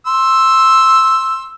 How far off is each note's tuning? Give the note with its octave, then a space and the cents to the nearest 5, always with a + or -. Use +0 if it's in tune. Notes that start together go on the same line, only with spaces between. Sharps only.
C6 +15 E6 +0